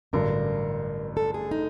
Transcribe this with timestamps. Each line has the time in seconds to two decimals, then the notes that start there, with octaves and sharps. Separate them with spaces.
0.13 A1 G2 D3 F#3 A#4
1.17 A4
1.34 G#4
1.51 D#4